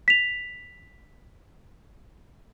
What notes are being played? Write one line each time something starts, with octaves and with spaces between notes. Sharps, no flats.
B6 F7